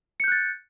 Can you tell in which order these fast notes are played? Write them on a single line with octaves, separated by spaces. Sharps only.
C#7 G6 F#6 A6